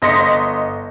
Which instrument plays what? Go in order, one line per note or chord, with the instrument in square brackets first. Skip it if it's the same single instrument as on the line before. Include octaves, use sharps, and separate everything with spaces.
[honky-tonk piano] G1 D#5 C6 A#6 B6 C#7